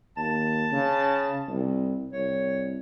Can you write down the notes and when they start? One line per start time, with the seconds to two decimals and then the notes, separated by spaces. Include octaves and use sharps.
0.17 D#2 A5
0.72 C#3
1.48 C2
2.13 C2 C#5